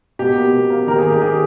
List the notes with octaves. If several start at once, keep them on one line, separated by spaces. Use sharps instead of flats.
B2 G4
A#3
B2
A#3
D#3 G4 A#4
G#4
A#3
G4
D#3 G#4